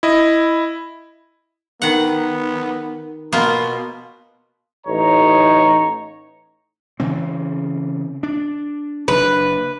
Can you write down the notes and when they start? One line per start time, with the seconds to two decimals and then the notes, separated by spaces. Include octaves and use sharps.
0.03 E4 D#5
1.82 D#3 B3 F#5
3.32 B2 A#3 B3 F4
4.87 A1 D#4 C#5 A#5
7.00 C#3 E3 C4
8.23 D4
9.08 F#1 A#2 D4 B4